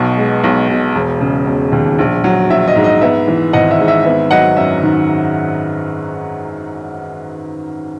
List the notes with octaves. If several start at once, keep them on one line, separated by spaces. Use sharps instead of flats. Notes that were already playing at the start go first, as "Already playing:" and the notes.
Already playing: B1 B2
G#3
B1
B2
E1
C#3
E1
D#2
A#1
F#3
A#1 E5
D#5
G#2
D#5
B3 E5
E3
G#1 D#5 F#5
E5
G#2
E5
B3 E5
F#3 D#5 F#5
F#2 E5
D#3